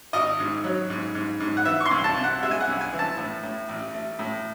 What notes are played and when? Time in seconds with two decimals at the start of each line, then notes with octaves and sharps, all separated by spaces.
0.13 G#1 D#5
0.40 G#2
0.64 F#3
0.90 G#2
1.15 G#2
1.40 G#2
1.57 F#5
1.65 E3 E5
1.80 C#6
1.86 C6
1.91 C2
2.04 A5
2.17 C3
2.24 F#5
2.43 G#3 E5
2.51 G#5
2.60 F#5
2.67 C2
2.81 G#5
2.93 E3
2.99 A5
3.18 A2
3.43 A2
3.69 A1
3.94 A3
4.19 A2